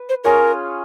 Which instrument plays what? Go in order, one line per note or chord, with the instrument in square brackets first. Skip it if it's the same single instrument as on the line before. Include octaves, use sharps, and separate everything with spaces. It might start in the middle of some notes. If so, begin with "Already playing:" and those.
Already playing: [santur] B4
[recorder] C5
[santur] C#4 F4 G#4 C#5 [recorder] A#4